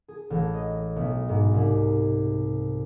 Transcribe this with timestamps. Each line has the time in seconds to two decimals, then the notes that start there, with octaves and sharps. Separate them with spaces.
0.08 G#4
0.30 A1
0.54 D#5
0.96 B1
1.29 G#2
1.54 C2